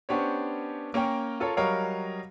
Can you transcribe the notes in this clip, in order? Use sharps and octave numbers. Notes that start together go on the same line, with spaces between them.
B3 C#4 D4 G4 C5 C#5
A#3 C#4 A#4 G5
F4 A4 A#4 C#5
F#3 G3 A#4 C#5 D#5 F5